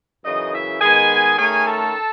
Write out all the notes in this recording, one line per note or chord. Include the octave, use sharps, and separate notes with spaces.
F#2 C#3 E3 D#4 D#5
E4 E5
D#3 G#3 B3 G#4 G#5
D#3 A3 C#4 G#4 G#5
A4 A5